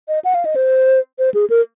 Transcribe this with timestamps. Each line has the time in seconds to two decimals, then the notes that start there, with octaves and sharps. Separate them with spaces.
0.08 D#5
0.25 F#5
0.35 F5
0.45 D#5
0.56 C5
1.19 C5
1.34 G#4
1.50 A#4